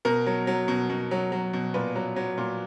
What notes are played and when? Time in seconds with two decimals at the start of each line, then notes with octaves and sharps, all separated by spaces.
0.05 B2 A#4
0.26 F#3
0.47 F#3
0.68 B2
0.90 B2
1.11 F#3
1.32 F#3
1.53 B2
1.74 A#2 B4
1.96 F#3
2.16 F#3
2.38 A#2